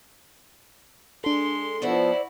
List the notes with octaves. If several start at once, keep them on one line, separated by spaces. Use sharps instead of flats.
G#3 D4 A4 C6
F3 B3 E4 F#4 C5 D5 E5